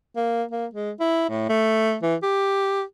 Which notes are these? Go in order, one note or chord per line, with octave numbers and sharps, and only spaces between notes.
A#3
A#3
G#3
E4
A2
A3
E3
G4